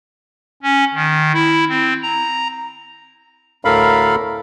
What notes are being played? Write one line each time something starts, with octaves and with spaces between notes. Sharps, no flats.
C#4
D#3
E4
C4
A#5
D2 A2 A4 A#4 F5 B5